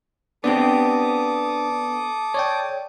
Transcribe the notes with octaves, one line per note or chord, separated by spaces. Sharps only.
B3 C4 D4 G4 A4 D5 D6 D#6
C#5 D5 G5